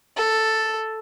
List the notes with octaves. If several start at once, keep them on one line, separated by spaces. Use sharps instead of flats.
A4